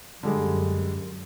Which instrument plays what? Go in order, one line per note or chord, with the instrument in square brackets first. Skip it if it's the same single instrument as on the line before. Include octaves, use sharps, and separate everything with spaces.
[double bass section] F#2 [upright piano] D3 G3 G#3